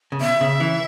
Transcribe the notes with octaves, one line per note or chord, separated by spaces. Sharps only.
C#3
B2 E5
C#3
E3